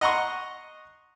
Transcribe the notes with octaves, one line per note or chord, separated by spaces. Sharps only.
D#5 F#5 A#5 C6 C#6